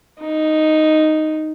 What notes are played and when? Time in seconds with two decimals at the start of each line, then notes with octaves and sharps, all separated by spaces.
0.21 D#4